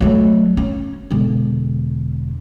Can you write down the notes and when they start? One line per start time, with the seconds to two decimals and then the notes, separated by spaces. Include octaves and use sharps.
0.01 F#3 A3
0.57 C#4
1.11 E1 D3